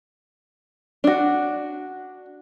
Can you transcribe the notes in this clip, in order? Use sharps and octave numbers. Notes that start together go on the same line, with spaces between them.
D4 F#4